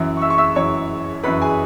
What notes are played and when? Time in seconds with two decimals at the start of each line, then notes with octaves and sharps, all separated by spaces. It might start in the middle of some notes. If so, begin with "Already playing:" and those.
Already playing: F#2 E3
0.17 C#6
0.22 E5 E6
0.30 C#6
0.38 E5 E6
0.55 F#2 E3 C#5 C#6
1.23 F#2 E3 B4 B5
1.42 G#4 G#5